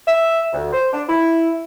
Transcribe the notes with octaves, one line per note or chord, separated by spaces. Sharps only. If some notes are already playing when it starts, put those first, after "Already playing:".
E5
D2
C5
D4
E4